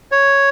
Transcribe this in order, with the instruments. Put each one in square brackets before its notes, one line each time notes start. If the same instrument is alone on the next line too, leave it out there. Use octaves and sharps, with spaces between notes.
[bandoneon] C#5